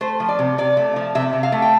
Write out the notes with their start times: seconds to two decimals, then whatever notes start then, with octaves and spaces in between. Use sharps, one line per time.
0.01 A3 C5
0.20 F3
0.29 D5
0.39 C3
0.58 C3 D5
0.77 A3
0.96 F3
1.15 C3 E5
1.33 C3
1.43 F5
1.52 A3
1.62 G5